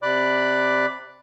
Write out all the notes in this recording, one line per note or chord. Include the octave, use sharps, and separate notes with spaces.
C3 D5 B5 D6 F#6